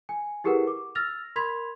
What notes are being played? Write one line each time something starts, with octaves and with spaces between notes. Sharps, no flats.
G#5
E4 G4 G#4 A#4 B4 F#5
D6
E6 F6 A6 A#6 F7
A#4 B5 C6 G#6 B6 F7